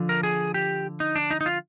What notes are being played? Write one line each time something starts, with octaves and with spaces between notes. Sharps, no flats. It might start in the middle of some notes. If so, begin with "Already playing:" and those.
Already playing: D3 F3
A#4
G#4
G4
D#4
D4
D#4
D#4
F4